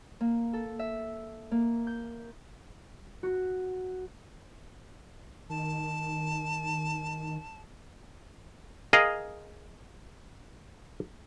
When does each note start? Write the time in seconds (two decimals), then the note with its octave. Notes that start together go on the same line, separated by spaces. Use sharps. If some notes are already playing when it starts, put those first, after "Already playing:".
0.21 A#3
0.53 A4
0.79 E5
1.51 A#3
1.87 G6
3.23 F#4
5.49 D#3 A5
8.93 G#4 A#4 D#5 F5